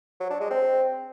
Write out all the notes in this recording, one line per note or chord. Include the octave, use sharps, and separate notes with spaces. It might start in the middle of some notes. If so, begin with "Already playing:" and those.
F#3
D4
G#3
C4